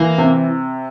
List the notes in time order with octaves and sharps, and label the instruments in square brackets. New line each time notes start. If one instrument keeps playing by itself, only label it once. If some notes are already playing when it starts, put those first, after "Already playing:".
Already playing: [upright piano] E3 [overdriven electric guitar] A#3
[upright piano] C3